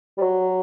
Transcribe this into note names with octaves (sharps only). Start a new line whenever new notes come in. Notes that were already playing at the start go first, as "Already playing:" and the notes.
G3
F#3